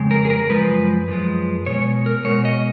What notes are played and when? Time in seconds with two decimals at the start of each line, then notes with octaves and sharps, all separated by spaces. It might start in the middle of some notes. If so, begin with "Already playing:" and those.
Already playing: F2 C#3 G#3
0.11 A#4
0.25 G#4
0.30 A#4
0.50 F#2 F3 G#3 B4
1.08 F#2 F3 G#3
1.66 B2 G#3 C#5
2.06 A#4
2.24 B2 G#3 C#5
2.45 D#5